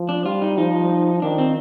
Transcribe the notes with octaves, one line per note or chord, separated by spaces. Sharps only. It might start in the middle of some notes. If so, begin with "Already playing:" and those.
Already playing: F3
D4
G3 F4
D#4
F3 D#4
D#3 D4
C4